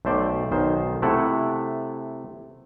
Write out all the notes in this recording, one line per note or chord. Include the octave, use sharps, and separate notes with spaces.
B1 A3 C5 D5
B1 D#3 C5
C3 A3 E4 A4 F#5